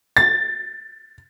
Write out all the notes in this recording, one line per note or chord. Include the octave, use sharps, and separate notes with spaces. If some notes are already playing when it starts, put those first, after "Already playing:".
A6